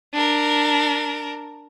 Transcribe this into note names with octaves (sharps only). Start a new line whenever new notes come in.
D4 A#4